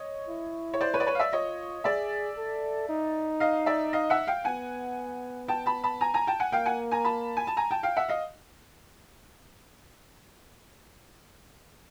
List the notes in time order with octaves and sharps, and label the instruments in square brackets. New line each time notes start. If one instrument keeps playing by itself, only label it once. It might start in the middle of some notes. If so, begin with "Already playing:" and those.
Already playing: [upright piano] C#5 D#5
[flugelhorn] E4
[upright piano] C#5
C5 D5
B4 C#5
D5
B4 C#5
F5
D5 E5
[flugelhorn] F4 [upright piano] C#5 D#5
[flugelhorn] G#4 [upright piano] D5 E5
[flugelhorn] A4
D#4
[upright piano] D#5 F5
D5 E5
D#5 F5
E5 F#5
F5 G5
[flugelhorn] B3 [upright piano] F#5 G#5
[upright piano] G5 A5
A5 B5
A5 B5
G#5 A#5
G#5 A#5
G5 A5
F#5 G#5
[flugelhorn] A#3 [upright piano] F5 G5
[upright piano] F#5 G#5
G#5 A#5
A5 B5
G#5
A5
G#5 A#5
G5 A5
F5 G5
E5 F#5
D#5 F5